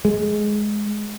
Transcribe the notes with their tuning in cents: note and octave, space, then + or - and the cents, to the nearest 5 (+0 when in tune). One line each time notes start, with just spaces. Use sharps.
G#3 +10